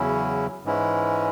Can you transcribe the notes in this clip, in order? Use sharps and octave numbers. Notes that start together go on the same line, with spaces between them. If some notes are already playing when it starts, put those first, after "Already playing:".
Already playing: E2 C#3 F#3 C#4 E4
G#2 E3 G#3 C#4 E4